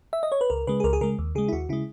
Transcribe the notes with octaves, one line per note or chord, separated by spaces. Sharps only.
E5
D#5
C#5
B4
C#2 A#4
C#3 G#3 B4
G#4
C#2 A#4
G#4
C#3 G#3 A#4
D#2
C#3 G#3 G#4
E4
D#2 F#4
C#3 G#3 E4